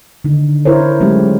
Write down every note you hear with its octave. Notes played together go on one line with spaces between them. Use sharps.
D3 D#3 D#4
D#4 E4 A#4 C5 C#5
F#3 G#3 A3 C#4 D#4 G4